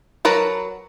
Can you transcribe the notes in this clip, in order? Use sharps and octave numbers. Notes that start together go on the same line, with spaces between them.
F#3 A#4 B4 A5